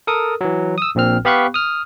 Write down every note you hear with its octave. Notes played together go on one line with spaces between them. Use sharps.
A4 A#4 D#6
E3 F#3
D#6 E6
A#1 A#2 C4 F6
B3 G4 F5 B5 C#6 F#6
D#6 F6